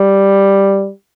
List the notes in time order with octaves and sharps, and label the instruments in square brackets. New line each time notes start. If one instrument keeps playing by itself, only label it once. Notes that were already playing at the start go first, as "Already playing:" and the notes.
Already playing: [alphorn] G3